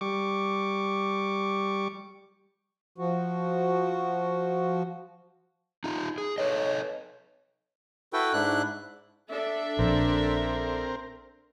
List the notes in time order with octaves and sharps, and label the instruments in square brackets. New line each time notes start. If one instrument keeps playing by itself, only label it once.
[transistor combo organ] G3 C#6 D6
[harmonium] F3 F#4
[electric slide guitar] D#4 F4
G#4
[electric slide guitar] A4 B4 D#5 [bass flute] C#5
[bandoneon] E4 F#4 A4 B4 G5
G#2 D4 E4 F#6
[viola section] D4 A4 E5
[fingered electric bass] A#1 [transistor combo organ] C4 A#4